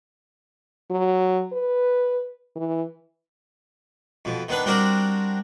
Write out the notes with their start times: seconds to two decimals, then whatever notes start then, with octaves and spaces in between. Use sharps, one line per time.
0.90 F#3
1.52 B4
2.56 E3
4.25 F2 B2
4.49 D#3 B3 D4 B4
4.65 G3 C4 D4 F#4 A#4 D5